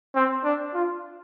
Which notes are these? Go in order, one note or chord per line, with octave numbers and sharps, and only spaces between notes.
C4
D4
F4